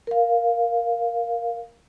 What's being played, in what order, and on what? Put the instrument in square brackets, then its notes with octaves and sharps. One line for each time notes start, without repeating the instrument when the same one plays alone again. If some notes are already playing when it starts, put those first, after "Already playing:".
[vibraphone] A#4 F5